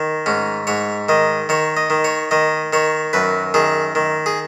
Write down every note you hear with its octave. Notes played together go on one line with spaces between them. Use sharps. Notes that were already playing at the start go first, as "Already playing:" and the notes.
Already playing: D#3
G#2 C#4
G#2 C#5
D#3 D#5
D#3 C#5
D#5
D#3
C#5
D#3 D#5
D#3 C#5
F#2 B4
D#3 G#4
D#3
G#4